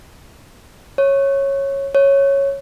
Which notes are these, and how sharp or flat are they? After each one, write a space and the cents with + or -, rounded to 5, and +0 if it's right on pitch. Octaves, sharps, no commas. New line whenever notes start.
C#5 -10
C#5 -5